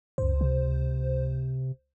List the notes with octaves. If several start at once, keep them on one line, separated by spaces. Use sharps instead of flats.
C#2 F#2 C5
C3